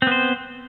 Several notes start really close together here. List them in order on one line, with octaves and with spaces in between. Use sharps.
C4 B3 C5